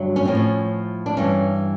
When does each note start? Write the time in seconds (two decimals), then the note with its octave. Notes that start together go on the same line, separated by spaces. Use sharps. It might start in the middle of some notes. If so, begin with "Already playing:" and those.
Already playing: G2 D3 F#3
0.16 C#4
0.25 A2 F3 C4
0.35 C#4
1.06 D4
1.17 G2 E3 C#4